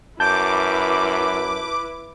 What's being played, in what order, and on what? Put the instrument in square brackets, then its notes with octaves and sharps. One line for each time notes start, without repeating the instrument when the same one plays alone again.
[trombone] F#2 [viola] E4 B4 [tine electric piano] A5 G6 [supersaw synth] D6